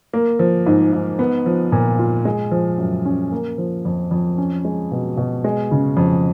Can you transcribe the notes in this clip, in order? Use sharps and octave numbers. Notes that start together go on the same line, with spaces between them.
A#3
F3
G#2
G#2
B3
F3
A#2
F4
G#3
F3
F#2
C#4
A#3
F3
F2
F2
C#4
G#3
B2
B2
G#3
C#3
F2